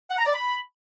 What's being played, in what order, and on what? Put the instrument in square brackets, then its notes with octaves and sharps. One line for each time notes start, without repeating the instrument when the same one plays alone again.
[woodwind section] F#5
A#5
D5
B5